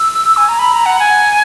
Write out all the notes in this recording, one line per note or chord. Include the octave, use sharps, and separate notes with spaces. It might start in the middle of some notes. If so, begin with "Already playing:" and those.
Already playing: E6
G#5
A#5
B5
A#5
F#5
G#5